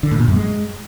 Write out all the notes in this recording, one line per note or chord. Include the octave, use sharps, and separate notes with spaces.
D3
A2
A#2
F#2
G#3